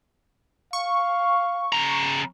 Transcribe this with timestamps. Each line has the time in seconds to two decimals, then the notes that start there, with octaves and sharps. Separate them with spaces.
0.73 F5 C#6
1.73 C#3 A#5